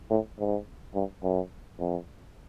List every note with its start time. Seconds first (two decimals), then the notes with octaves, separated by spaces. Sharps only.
0.10 A2
0.39 G#2
0.94 G2
1.23 F#2
1.79 F2